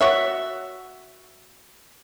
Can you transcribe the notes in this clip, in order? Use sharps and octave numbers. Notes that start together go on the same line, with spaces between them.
F#4 C#5 E5